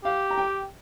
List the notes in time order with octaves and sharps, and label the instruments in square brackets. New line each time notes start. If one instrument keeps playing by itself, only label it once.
[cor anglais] G4 [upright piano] F5
[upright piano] A#5
G5